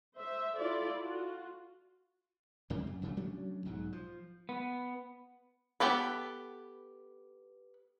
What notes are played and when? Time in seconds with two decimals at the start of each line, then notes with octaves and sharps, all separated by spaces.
0.17 C5 E5
0.57 E4 F4 A4 D5
0.99 F4 F#4
2.70 C#2 C3 G3 A#3
2.87 F#2
3.02 A#1 C#3 G3 A3
3.17 F#3 A3 C#4 D4
3.65 B1 G#2 F#3
3.92 F3
4.49 B3
5.80 B3 G4 A4 B4